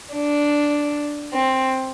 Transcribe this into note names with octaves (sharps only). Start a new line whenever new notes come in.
D4
C4